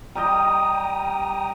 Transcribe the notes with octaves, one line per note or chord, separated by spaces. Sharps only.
G3 G4 D#5 G5 A#5 D#6